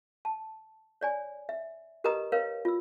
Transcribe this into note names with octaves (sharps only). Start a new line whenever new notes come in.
A5
C#5 D5 G#5
E5
G4 A#4 B4 D#5 A#5 D#6
A#4 B4 C#5 F5
F4 E6